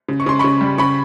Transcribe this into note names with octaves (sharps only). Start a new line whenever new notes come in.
C#3
C#6
C#3 C6
C#3 B5 C#6
G3
C#3 B5 C#6